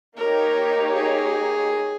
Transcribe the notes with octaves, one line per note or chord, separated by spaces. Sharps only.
A#3 D#4 G4 A#4 C#5
G#4